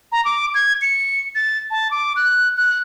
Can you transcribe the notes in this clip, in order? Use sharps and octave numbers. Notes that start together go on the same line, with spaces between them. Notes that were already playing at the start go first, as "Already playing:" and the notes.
A#5
D6
G#6
C#7
A6
A5
D6
F#6
F#6